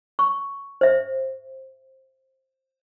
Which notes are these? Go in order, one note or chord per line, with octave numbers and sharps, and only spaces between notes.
C#6
C5 E5